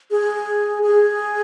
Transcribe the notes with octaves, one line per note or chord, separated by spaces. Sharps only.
G#4
G#4